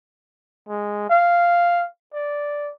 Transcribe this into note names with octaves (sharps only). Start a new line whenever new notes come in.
G#3
F5
D5